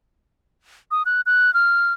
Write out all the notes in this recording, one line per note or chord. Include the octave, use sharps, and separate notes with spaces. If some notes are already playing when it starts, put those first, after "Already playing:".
D#6
F#6
F#6
F6